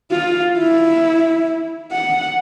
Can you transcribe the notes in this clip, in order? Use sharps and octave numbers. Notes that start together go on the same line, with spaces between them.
F4
E4
F#5